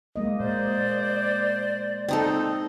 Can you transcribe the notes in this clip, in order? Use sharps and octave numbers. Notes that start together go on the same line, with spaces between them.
G#3 A#3 D#5
A#2 C5 D5
C4 D#4 A4